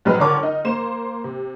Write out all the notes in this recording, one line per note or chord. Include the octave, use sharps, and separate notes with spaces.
A#1 F#3 G#3 B4 F6
C#2 D3 A#4 C#5 A5 D6
D#4
A#3 C5 E7
C3